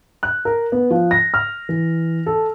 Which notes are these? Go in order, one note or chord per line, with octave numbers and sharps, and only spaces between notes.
F#6
A#4
B3
F3
A#6
F6
E3
A4